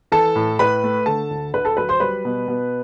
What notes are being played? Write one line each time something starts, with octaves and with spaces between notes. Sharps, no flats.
E3 A4 A5
A2
A2 B4 B5
A3
D3 A4 A5
D2
D2 B4 B5
A4 A5
F#3 B4 B5
C5 C6
G3 B4 B5
B2
B2